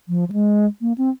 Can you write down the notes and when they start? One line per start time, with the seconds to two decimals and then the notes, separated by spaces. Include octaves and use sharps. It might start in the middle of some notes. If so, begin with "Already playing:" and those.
0.09 F3
0.28 F3
0.32 G#3
0.81 A#3
0.98 C4